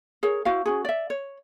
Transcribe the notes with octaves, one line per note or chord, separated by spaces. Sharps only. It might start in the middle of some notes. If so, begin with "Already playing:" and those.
G#4 A#4 C#5
E4 F#4 C5 F5
C#4 F#4 G#4
D5 E5
C#5